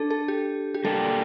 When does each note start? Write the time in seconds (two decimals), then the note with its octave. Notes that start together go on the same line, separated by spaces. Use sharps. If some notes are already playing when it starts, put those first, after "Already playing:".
Already playing: D4 A4
0.10 A4
0.28 G4
0.74 G4
0.84 G3 A#3 D4 G4 A4 D5